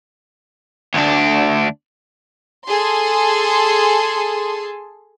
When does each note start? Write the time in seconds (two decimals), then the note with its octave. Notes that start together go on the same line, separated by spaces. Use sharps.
0.95 D2 D4
2.68 G#4 A4 C6